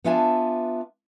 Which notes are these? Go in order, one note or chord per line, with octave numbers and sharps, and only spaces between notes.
B3 D4 F4 E5 G#5 A5